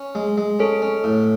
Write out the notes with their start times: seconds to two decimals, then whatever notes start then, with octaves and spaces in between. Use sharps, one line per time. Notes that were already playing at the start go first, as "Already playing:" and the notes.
Already playing: C#4
0.15 G#3
0.38 G#3
0.59 C#4 A4
0.82 C#4
1.04 A2